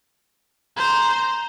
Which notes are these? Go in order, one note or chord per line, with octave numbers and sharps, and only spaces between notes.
C5 A#5